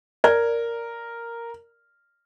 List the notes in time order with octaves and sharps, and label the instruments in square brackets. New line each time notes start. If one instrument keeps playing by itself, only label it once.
[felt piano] A#4 [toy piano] D5